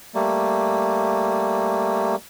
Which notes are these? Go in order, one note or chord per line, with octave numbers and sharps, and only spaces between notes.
G3 A3 A#3